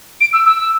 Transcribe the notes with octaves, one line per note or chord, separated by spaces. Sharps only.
D7
E6
E6